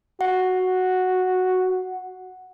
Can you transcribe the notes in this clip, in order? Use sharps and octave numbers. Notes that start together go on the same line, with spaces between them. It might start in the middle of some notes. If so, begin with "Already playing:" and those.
F#4 F#5